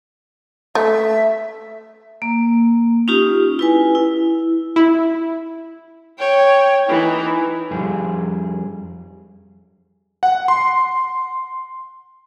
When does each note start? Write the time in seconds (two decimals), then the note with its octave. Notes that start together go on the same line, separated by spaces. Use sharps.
0.75 A3 E5
2.22 A#3
3.08 C#4 D#4 F4 G4
3.59 E4 B4 G#5
3.95 E4
4.76 E4
6.19 C#5 G5
6.87 E3 D#4
7.71 F2 G3 G#4
10.23 F#5
10.48 C6